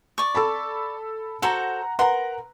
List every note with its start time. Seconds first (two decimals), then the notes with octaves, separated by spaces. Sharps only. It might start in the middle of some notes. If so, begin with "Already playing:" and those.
0.18 D5 C#6
0.35 A4 A5 B5
1.42 F#4 A4 C5 F#5 A#5
1.99 A#4 B4 F#5 A#5 C6